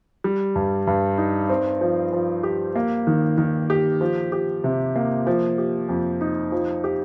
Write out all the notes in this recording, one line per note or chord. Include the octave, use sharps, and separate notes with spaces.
G3
G2
G2
D#4
C4
F3
F3
G4
A#3
D#3
D#3
G4
F3
G4
C3
A#3
F3
G4
F2
D#4
F3
G4